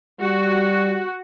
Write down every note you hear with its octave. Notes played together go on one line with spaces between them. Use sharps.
G3 F#4